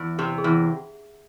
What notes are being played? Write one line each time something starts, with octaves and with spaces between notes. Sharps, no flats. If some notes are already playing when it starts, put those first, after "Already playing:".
Already playing: E2
C3 G4
G#4
E2